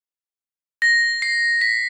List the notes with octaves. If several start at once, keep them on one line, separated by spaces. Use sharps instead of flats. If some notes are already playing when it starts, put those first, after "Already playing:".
A#6
C7
B6